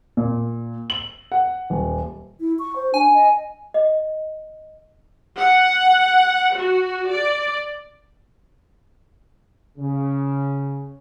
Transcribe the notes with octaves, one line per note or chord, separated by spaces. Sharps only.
A#2
F#7
F#5
D#1
E4
C#6
C5
D4 G#5
D#5
D#5
F#5
F#4
D5
C#3